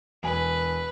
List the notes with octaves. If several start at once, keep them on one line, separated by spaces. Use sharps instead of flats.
E1 B4 G#5